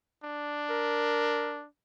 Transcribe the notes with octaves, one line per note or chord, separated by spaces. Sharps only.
D4
A#4